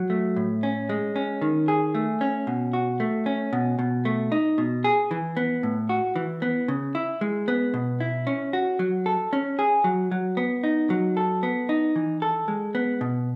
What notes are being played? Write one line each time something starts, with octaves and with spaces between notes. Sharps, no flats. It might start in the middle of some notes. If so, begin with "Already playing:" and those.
Already playing: F#3
A3
A2
C#4
G#3
C#4
D#3
G#4
A3
C#4
B2
F#4
A3
C#4
B2
B2
A3
D#4
B2
G#4
E3
B3
A2
F#4
E3
B3
C#3
E4
G#3
B3
B2
E4
C#4
F#4
F#3
A4
C#4
G#4
F#3
F#3
B3
D#4
F#3
A4
B3
D#4
E3
A4
G#3
B3
B2